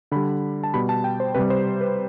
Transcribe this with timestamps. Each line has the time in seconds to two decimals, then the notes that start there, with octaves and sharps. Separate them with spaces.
0.12 D3 G3 B5
0.64 A5
0.74 B2 G3 B5
0.89 A5
1.04 G5
1.20 C5
1.35 C3 G3 B4
1.50 C5
1.81 B4